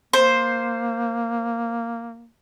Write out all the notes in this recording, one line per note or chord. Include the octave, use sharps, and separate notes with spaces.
A#3 C5